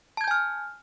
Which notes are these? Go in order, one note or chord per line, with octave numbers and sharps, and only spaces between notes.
G#5 A5 F6 G6 G#6